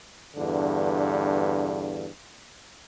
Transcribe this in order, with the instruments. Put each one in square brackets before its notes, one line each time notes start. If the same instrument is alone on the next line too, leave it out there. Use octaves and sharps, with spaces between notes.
[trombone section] E2 G2 D3